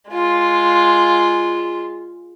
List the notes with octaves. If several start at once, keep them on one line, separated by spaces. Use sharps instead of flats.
G#3 F4